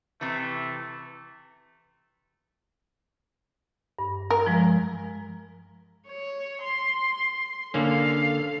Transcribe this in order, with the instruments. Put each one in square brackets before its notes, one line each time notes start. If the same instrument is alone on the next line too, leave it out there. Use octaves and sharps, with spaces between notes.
[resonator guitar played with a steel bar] C3 E3 [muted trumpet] A3
[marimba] G2
[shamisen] A#4
[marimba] F3 G#3
[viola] C#5
C6
[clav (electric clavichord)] D3 A#3 C#4 [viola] A4 F5